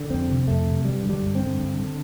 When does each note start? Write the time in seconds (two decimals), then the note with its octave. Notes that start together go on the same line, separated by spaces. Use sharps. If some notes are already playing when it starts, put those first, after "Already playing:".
Already playing: D3
0.10 F2 C4
0.28 C3
0.47 F2 A3
0.66 C3
0.85 G2 G3
1.03 D3
1.09 G3
1.22 G2
1.35 C4
1.42 D3
1.59 G2
1.79 D3